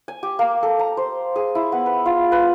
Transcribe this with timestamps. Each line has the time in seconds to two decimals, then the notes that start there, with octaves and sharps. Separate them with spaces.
0.08 G#5
0.23 G4
0.39 A#3
0.63 A4
0.79 A#5
0.97 C5
1.36 G#4
1.55 E4
1.72 B3
1.86 B4
2.06 F4
2.32 B4